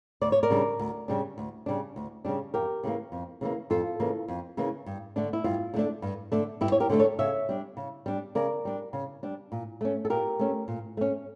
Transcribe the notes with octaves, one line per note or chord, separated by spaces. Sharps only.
D2 D5
C#5
A#4 D5
C#3 G3 D4
D2
C#3 G3 D4
D2
C#3 G3 D4
D2
C#3 G3 D4
F2 G4 A#4
C#3 E3 A#3
F2
C#3 E3 A#3
F2 F4 A4
C#3 E3 A#3
F2
C#3 E3 A#3
G2
D3 A3 D4
E4
G2 F4
D3 A3 D4
G2
D3 A3 D4
G2 E4 G4
C#5
G4 A#4
D3 A3 D4
A4 C#5
C#3 C#5 E5
G3 D4
C#3
G3 D4
C#3 A#4 D5
G3 D4
C#3
G3 D4
A#2
A3 C#4
A4
A#2 G4 A#4
A3 C#4
A#2
A3 C#4